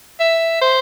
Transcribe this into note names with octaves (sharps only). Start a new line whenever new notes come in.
E5
C5